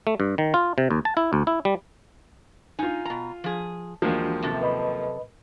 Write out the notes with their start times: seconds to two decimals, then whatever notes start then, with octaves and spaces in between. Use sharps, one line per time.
0.07 A3
0.20 G2
0.38 D#3
0.54 F4
0.78 C3
0.90 D#2
1.05 A5
1.17 E4
1.33 D2
1.47 E4
1.65 G3
2.79 D#4 F4 G#5
3.05 B2 A#5
3.44 F3 G#4
4.02 D#2 E3 F3 G#3 D4 F#4
4.42 F#2 C3 A4
4.61 B4 D#5 B5